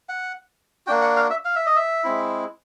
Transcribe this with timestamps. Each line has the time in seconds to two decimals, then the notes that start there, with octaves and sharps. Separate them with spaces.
0.09 F#5
0.87 A#3 D4 F#4 G5
1.01 F#5
1.16 F5
1.30 E5
1.45 F5
1.56 E5
1.66 D#5
1.76 E5
2.04 G#3 C4 E4